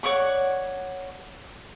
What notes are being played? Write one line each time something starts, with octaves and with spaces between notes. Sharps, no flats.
C#5 D5 F#5 C#6